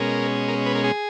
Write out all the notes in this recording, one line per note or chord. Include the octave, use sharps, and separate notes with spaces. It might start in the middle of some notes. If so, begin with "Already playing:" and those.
Already playing: B2 G#3 C#4 A#4
A#4
B4
A#4
G#4